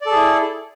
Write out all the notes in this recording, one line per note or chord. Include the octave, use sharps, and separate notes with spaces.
E4 G#4 A4 D5